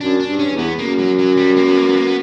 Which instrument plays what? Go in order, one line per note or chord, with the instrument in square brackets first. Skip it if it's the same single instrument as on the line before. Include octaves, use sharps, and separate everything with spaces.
[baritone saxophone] F#2 [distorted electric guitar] D4
[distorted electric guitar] D4
[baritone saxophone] G2
[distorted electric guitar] C#4
[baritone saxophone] E2
[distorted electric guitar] B3
[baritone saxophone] F#2 [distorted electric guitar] A#3
[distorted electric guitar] F#3
F#3
G3
A#3
B3
A#3
B3
A#3
B3